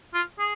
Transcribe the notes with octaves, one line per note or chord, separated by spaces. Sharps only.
F4
G#4